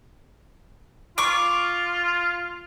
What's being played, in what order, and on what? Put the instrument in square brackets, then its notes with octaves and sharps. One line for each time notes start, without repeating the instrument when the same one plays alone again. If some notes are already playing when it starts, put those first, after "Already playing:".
[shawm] F4 [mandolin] C#6 D6